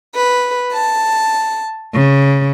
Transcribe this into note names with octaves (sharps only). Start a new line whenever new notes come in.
B4
A5
C#3